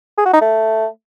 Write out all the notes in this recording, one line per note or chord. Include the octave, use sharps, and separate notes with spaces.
G#4
F#4
D#4
A3